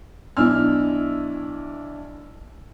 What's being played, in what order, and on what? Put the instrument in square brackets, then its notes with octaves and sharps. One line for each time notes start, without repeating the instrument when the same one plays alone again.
[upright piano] B1 D4 E4 G#5 E6 F6